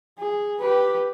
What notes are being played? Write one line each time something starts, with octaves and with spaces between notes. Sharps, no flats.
G#4
G4 B4